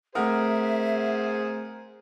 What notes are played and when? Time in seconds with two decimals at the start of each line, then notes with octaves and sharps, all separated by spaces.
0.15 A3 C4 G#4 A#4 C5 E5 F#5 D#6